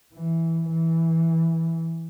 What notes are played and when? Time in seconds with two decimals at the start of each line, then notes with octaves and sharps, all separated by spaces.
0.14 E3
0.70 E3